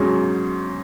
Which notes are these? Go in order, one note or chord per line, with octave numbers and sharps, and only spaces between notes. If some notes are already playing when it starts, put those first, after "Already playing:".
Already playing: G#2 F#3 C#4 G#4